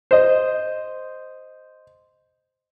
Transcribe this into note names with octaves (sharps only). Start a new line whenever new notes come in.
C5 D#5